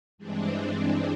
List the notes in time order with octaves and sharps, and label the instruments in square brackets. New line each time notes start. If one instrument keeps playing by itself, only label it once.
[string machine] G2 E3 G#3 C4 D4